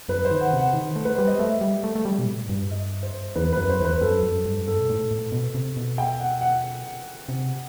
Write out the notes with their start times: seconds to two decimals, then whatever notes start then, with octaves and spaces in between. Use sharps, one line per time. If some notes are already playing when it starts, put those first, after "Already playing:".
0.09 F#2 B4
0.25 C5
0.31 D#3
0.41 F#5
0.53 C3 F#5
0.74 D#3
0.96 A3
1.05 B4
1.16 G3 C5
1.27 D#5
1.39 A3 E5
1.61 G3
1.84 A3
1.95 A3
2.05 G3
2.19 B2
2.27 A2
2.49 G2
2.71 D#5
3.03 C5
3.35 E2 B4
3.53 F#2 B4
3.69 C5
3.80 E2 B4
4.01 F#2 A4
4.23 F#2
4.45 G2
4.60 F#2
4.67 G2 A4
4.79 B2
4.89 A2
5.11 A2
5.32 B2
5.55 C3
5.77 B2
5.98 G5
6.20 F#5
6.41 F#5
7.29 C3